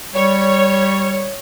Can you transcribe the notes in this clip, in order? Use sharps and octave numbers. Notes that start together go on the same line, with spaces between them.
G3 C#5